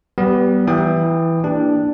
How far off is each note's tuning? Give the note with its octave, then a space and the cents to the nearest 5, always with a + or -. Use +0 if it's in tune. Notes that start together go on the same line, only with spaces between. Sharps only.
G3 -25 B3 +0 G4 +0
E3 +0 G5 +15 D#6 -20
A#3 +0 D4 +0 G4 +0